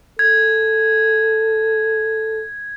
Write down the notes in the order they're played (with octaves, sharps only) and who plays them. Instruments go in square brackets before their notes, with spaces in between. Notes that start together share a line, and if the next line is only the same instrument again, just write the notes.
[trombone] A4 [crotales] G#6